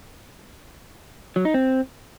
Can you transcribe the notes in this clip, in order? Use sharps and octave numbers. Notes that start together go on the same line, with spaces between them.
F#3
D#4
C4